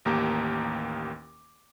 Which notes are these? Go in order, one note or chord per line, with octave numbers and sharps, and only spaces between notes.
A1 D#2 A#3 G4 A#5 D6